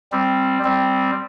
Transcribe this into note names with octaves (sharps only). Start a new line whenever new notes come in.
G3 C4
G3 C4